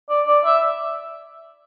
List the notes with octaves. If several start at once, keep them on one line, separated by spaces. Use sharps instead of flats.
D5
D5
E5